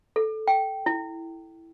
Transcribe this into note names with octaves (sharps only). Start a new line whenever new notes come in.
A4
G5
E4